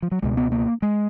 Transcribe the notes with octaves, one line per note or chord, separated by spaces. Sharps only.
F3
F#3
C#2 B2 G#3
B3
A#3
G#3